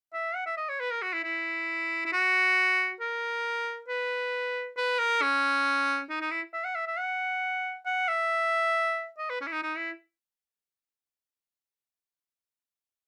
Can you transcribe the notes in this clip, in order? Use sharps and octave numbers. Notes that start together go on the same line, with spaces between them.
E5
F#5
E5
D#5
C#5
B4
A#4
F#4
E4
E4
E4
F#4
A#4
B4
B4
A#4
C#4
D#4
D#4
E4
E5
F#5
E5
E5
F#5
F#5
E5
D#5
B4
C#4
E4
D#4
D#4
E4